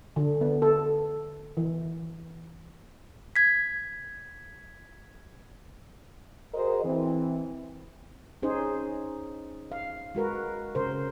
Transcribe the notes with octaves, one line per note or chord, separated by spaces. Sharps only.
D3
B3
A4
E3
G#6 B6
F#4 G#4 A#4 C5 D#5
E3 C4
C#4 D#4 G#4 C5
F5
G#3 F#4 A#4 B4
C#3 A#4 C5